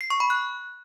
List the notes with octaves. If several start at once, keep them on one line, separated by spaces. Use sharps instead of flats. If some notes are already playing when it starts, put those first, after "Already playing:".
C7
C#6
B5
F#6